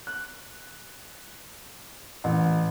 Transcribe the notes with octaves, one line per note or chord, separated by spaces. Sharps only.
F#6
A1